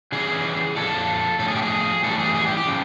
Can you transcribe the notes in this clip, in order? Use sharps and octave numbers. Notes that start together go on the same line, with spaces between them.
C#3 E3 G3 G#4
A#2 F3 A4
A2 F3 A4
G#4
G4
G#4
A2 E3 G3 A4
G#4
G#4
G4
G4
C#3 F3